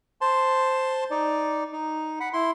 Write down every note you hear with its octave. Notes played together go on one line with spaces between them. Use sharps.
C5 A5 C6
D#4 D5
D#4
F#5 B5
E4 C6